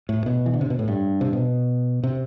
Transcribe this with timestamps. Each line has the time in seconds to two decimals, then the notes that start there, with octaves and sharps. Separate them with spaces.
0.09 A2
0.26 B2
0.46 E3
0.54 D3
0.61 C3
0.70 B2
0.79 A2
0.88 G2
1.21 C3
1.33 B2
2.03 C3